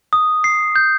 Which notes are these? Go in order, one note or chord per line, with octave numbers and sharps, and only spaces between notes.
D#6
C7
G6